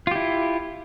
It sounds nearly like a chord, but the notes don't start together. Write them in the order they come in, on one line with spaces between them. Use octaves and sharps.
F4 G4 E4